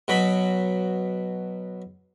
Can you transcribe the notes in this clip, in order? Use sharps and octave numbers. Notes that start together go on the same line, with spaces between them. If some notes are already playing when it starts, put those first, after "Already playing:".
B2 F#3 B5